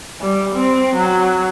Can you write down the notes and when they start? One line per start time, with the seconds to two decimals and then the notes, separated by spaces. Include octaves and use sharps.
0.21 G3
0.55 C4
0.95 F#3